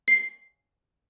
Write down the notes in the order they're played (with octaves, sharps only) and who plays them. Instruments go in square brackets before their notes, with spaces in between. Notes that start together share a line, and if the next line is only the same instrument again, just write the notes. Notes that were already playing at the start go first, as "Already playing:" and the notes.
[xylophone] C7